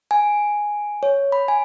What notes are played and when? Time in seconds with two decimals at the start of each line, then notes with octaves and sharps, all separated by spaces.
0.11 G#5
1.03 C#5
1.32 B5
1.48 G#5